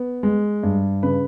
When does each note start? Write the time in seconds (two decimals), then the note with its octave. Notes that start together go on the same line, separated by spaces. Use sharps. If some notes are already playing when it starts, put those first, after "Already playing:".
Already playing: B3
0.23 G#3
0.63 G2
1.03 C#3 B4